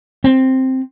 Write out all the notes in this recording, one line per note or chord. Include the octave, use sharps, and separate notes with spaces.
C4